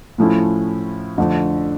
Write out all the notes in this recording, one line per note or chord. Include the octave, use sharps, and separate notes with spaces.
A2 F3 A3 C#4 E4
F2 D3 F3 A3